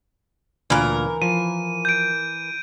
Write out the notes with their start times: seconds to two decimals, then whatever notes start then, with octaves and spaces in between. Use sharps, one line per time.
0.70 D2 A#2 E3 A#4 F5
1.22 F3 D#7
1.85 G6 D7